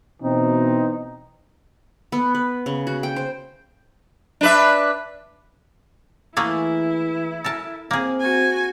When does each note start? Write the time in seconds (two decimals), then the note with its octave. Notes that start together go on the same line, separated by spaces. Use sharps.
0.22 B2 E3 C4 D#4
2.12 B3
2.35 B4
2.66 C#3
2.87 F#4
3.03 G5
3.16 C5
4.41 D4 B4 E5
6.37 E3 A3 A#3 E4 G#4
7.44 A4 A#4 A5
7.91 A#3 C4 G#4
8.20 F#4 G#5